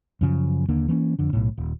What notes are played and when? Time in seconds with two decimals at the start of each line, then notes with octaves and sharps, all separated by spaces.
0.21 F#2 C#3 F3
0.69 D#2 D3 A#3
0.88 E3 A#3 C4 C#4
1.19 F2 D3
1.33 B1 A2
1.58 D#1